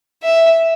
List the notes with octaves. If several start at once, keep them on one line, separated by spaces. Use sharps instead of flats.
E5